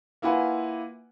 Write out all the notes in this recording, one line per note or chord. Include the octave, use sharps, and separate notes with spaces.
A#3 E4 F4 B4 F#5 G#5